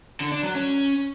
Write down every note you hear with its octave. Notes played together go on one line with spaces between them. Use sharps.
D3
D4
F#3
C#4